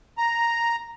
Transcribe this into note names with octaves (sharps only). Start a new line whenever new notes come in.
A#5